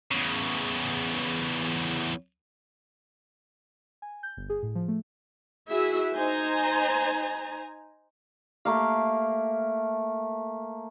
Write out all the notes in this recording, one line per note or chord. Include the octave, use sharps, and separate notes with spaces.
E2 C#3
G#5
G6
G1
G#4
A2
F3
A3
E4 F#4 G#4 E5
D#4 C5 G#5 A#5
A3 A#3 F5